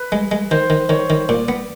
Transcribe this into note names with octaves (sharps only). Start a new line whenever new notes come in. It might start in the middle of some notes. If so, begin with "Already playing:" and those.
Already playing: B4
G#3
G#3
D#3 C5
D#3
D#3 C#5
D#3
A#2 D5
B3